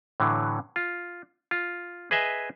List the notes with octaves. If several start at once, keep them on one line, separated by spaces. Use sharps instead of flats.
A2 D3 E3 F#3
F4
F4
G#4 B4 D#5 E5 G#5